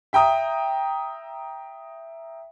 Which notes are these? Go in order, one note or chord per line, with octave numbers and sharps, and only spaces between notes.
E5 G5 A#5 D#6